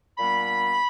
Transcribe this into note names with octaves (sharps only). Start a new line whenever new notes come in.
A#2 G3 B3 D4 B5